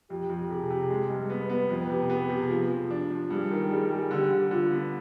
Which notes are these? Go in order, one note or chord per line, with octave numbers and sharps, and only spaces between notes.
F2 G4
F2
C3 G#4
C3
G#3
G2
B3 B4
B3
F2 B4
C3
B3 G#4
C3
F3
F3
D4
F3
G2 G#4
D#3
G3 G#4
G3
D3 G4
D3
D3 F4
B3